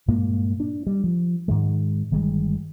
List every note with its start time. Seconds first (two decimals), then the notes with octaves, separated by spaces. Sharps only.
0.08 G2 A#2 G#3 A#3
0.60 D4
0.87 G3
1.04 F3
1.48 G#2 D#3 G#3
2.11 G1 D#3 G3 G#3